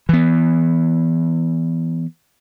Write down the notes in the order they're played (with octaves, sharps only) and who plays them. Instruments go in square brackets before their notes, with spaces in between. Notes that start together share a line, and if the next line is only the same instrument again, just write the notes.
[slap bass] E3 B3